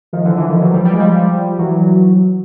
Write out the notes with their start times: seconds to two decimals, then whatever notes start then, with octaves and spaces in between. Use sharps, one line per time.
0.13 D#3 F3
0.25 D3 E3
0.37 D3 E3
0.49 D#3 F3
0.61 E3 F#3
0.73 F3 G3
0.85 G3
0.93 G#3
1.00 F3 G3
1.58 E3 F#3